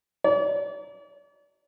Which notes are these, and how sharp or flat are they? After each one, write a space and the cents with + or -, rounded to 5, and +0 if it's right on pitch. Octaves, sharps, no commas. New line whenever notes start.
D5 -40